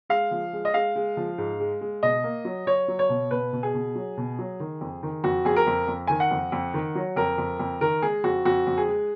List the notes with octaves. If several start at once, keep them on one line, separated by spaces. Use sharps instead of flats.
G#3 F5
F3
G#3
D#5
G#3 F5
G#3
F3
G#2
G#3
G#3
B2 D#5
A#3
F#3
F#3 C#5
F#3
C#5
B2
B2 B4
B2
G#4
B2
F#3
B2
F#3
D#3
F2
D#3
F2 F#4
F2 G#4
A#4
F2
F2
D#3 G#5
F#5
F2
F2
D#3
F#3
F2 A#4
F2
F2
D#3 A#4
G#3 G#4
F2 F#4
F2 F#4
F2
G#4
G#3